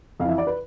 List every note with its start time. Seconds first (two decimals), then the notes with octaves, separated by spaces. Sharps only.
0.20 F2 E3 F5
0.29 E5
0.38 D5
0.47 B4